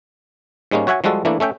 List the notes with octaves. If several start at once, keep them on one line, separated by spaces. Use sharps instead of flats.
G#2 G3 G#3 A#3 C#4
F#4 C#5 E5 F#5 G#5
F3 G3 G#3 F#4 A4
E3 A3 A#3 D4 E4
A3 C#4 E5 G5